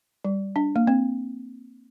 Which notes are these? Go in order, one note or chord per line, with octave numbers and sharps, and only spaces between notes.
G3
D4
A#3
C4